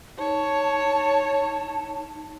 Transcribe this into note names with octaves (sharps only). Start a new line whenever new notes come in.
D#4 C#5 A5